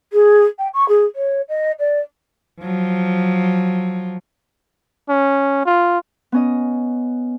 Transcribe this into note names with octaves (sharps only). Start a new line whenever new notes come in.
G#4
G5
C#6
G#4
C#5
D#5
D5
F3 F#3
C#4
F4
B3 C#4 D#5